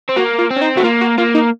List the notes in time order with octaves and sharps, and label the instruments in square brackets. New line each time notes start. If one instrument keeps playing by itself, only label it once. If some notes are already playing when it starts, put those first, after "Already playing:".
[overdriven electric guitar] C4
[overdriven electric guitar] A#3 [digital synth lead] F#4
[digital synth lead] F4
[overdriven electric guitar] C4
[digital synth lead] C#4
D#4
[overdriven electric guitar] A3 [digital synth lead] F#4
[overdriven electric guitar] A#3 [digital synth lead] F4
[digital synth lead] F#4
[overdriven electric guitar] A#3 [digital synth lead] F4
[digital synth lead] D#4